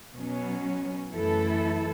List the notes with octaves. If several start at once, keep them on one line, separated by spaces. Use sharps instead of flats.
B2 F#3 C#4
F#2 E3 A3 E4 A4